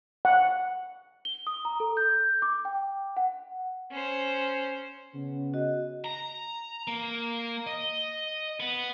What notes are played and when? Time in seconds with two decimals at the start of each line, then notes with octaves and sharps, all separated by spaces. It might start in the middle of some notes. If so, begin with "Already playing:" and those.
0.25 F#5
1.25 G7
1.47 D#6
1.65 A#5
1.80 A4
1.97 G6
2.42 D6
2.65 G5
3.17 F#5
3.91 C#4 C5
5.14 C#3 B3 C#4
5.54 F#4 D#5
6.04 A#5
6.87 A#3
7.67 D#5
8.60 B3